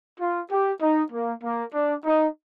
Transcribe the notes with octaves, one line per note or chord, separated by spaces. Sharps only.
F4
G4
D#4
A#3
A#3
D4
D#4